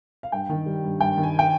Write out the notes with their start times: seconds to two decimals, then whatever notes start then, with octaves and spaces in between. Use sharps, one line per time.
0.23 F5
0.32 G2 G5
0.49 D#3
0.66 G3
0.84 G2
1.00 G2 G5
1.18 D#3
1.23 G#5
1.39 G5